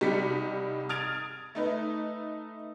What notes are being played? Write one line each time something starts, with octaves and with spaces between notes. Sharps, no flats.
C2 G3 D#4 D5 B6 C#7
D#6 F6 G#6 A6 D7 F7
A3 D#4 B4